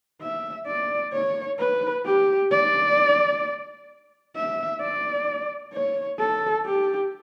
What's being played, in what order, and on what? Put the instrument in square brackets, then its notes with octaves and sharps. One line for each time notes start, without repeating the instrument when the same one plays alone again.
[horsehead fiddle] E5
D5
C#5
B4
G4
D5
E5
D5
C#5
A4
G4